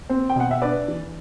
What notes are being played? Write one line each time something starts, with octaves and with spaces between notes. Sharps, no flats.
C4
G5
B2 F#5
E5
D4 B4 D5
E3